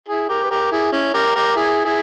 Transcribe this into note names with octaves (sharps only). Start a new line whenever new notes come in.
E4 G#4
G4 A#4
B4
G4 A#4
E4 G#4
C#4 E4
G4 A#4
G4 A#4
E4 G#4
E4 G#4